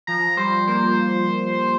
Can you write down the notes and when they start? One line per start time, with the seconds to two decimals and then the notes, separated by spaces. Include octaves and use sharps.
0.07 F3 A#5
0.37 G3 C5
0.67 A#3 C5
0.87 A#3